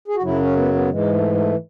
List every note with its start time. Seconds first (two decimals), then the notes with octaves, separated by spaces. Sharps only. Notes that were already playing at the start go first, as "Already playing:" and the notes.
0.08 G#4
0.15 F#4
0.22 F#2 C#3 F#3 E4
0.39 C#4
0.57 B3
0.73 B3
0.90 G#2 E3 G#3
1.13 A3
1.34 A3